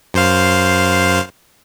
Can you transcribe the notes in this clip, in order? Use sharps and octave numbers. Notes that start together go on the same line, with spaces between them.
F#2 C5 F5